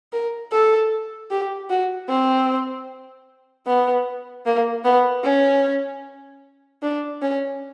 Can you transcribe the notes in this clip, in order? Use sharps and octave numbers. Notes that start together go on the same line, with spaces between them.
A#4
A4
G4
F#4
C4
B3
A#3
B3
C#4
D4
C#4